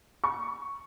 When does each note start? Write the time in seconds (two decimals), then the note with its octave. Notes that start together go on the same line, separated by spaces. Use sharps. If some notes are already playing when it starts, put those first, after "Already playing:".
0.24 C#6